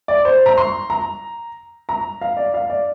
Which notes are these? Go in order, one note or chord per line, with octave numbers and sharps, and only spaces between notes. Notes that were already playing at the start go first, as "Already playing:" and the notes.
D5
C5
A#5
C6
A#5
A#5
F5
D5
F5
D5